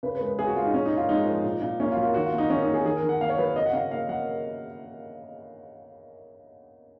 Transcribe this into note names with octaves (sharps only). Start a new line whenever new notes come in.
C#3 B4
B4
G#3
B4
C#3 G#4
F#4
G#3 F4
D#4
A#2 C#4
D#4
A#2
F4
G#3 D#4
F3
A#2
A#2
A#3 C#4
F4
F#3
F4
D#3 F#4
F4
A#3
D#4
D#3 C#4
D#4
A#3
G#4
D#3 G#4
A#4
D#3
F#5
A#3 F5
C#5
F#3 B4
C#5
C#3 D#5
F#5
C#3 F5
A#3 F5
F#3 F#5